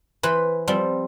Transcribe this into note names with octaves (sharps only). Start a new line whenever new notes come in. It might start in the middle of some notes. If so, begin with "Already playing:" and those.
E3 B4 C5
F3 G3 C4